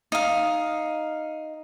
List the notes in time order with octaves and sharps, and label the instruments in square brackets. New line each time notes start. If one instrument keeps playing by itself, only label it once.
[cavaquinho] D#4 F5